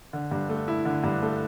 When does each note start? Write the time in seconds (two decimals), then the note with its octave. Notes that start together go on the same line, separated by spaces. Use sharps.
0.13 D3
0.31 G2
0.49 A3
0.68 E4
0.85 D3
1.04 G2
1.22 A3